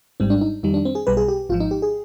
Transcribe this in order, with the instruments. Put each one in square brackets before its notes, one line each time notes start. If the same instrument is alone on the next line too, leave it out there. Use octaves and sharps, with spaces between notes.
[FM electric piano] G#1 G#2 G3 C4
D4
D#4
F2 D#3 G3 D#4
D4
C4
G#4
B1 B2 G3 B4
G#4
G4
G#1 G#2 F3 F4
D#4
G4
G#4